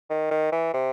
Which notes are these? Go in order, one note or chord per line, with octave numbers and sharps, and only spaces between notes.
D#3
D#3
E3
C3